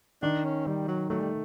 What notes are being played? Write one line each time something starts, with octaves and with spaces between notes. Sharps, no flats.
D#3 D4
C#4
D#3 G3
F#3
F#3 A3
G3